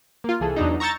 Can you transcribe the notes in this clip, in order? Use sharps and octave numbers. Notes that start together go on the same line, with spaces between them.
A#3 F4
C2 E3 G#4 A4
E2 F#3 D4 D#4
A#5 C#6 E6 G6 A6